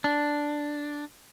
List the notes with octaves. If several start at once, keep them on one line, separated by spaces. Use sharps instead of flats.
D4